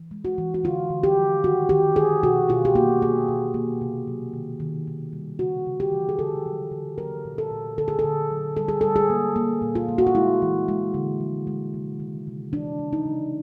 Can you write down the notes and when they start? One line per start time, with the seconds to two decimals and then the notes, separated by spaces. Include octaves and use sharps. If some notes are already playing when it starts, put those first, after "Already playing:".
Already playing: E3
0.11 G#3
0.25 F#4
0.38 E3
0.54 F#4
0.64 D3 F4
0.90 D3
1.03 G4
1.17 F3
1.44 D#3 F#4
1.69 D#3 G4
1.96 D#3 G#4
2.23 B2 F#4
2.49 B2 F4
2.65 G4
2.75 A#3 F#4
3.02 A#3 G#4
3.28 B2
3.54 A#3
3.82 C3
4.08 F#3
4.34 D#3
4.60 D#3
4.88 D#3
5.13 G3
5.39 C#3 F#4
5.66 C#3
5.80 G4
5.92 E3
6.09 G#4
6.19 D3 A4
6.46 F#3
6.72 D3
6.98 F#3 A#4
7.25 A#2
7.38 A4
7.50 A#2
7.78 D3 A4
7.88 G#4
7.99 A4
8.04 D3
8.30 F#3
8.57 G3 A4
8.68 G#4
8.81 G3 A4
8.96 G#4
9.10 A#3
9.36 A#3
9.62 A#2
9.75 F4
9.89 A#3
9.98 F#4
10.07 F4
10.15 G#3 E4
10.42 E3
10.68 G#3
10.94 D3
11.20 F3
11.47 G#3
11.74 C3
12.00 D#3
12.27 C3
12.53 E3 D4
12.79 C#3
12.93 D#4
13.05 C#3